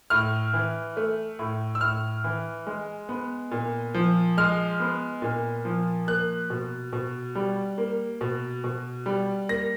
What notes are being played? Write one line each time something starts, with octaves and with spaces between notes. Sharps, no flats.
A2 F6
E3
A3
A2
E6
A2 F6
E3
G#3
B3
A#2
F3
G#3 F6
B3
A#2
F3
A#3 F#6
B2
B2
G3
A#3
B2
B2
G3
A#3 A#6